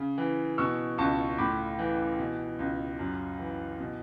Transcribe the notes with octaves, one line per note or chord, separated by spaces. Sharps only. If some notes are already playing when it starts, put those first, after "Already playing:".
Already playing: C#3
E3
B2 C#6 E6
C#2 A5 C#6
A2 B5 D6
E3
B2
C#2
F#2
E3
B2